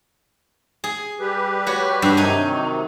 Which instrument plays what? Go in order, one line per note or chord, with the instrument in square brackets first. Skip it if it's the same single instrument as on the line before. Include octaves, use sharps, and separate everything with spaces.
[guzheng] G#4
[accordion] G3 G4 B4
[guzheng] F#4 C#5
G2
[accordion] C3 D#3 F#3 [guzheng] D#4 G#5